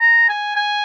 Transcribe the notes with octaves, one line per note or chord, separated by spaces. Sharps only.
A#5
G#5
G#5